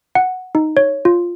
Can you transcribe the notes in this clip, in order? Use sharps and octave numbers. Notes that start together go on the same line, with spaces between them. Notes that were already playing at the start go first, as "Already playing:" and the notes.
F#5
D#4
C#5
F4